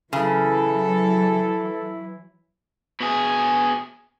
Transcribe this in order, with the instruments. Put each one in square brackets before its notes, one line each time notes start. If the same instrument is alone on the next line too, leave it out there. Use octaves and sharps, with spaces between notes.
[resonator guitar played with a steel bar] C#3 [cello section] E3 F#3 [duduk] E4 [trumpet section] A4
[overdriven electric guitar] B2 G#4